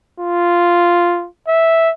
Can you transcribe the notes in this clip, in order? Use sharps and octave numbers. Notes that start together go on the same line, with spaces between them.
F4
E5